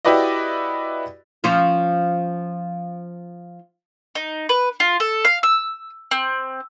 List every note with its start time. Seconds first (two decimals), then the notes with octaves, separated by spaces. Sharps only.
0.05 E4 F#4 G4 B4 D5 D#5
1.44 F3 C#4 F4
4.15 D#4
4.49 B4
4.80 F4
5.00 A4
5.25 F5
5.43 E6
6.11 C4